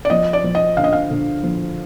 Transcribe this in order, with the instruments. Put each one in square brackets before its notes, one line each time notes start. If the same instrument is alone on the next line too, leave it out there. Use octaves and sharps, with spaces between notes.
[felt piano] D5
[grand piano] F3 [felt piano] D#5
[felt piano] D5
[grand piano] F3
[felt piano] D#5
[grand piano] D3 [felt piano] F5
[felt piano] D#5
F5
[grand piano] D3
F3